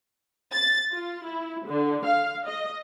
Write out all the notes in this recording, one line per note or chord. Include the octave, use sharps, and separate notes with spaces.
A6
F4
E4
D3
F5
D#5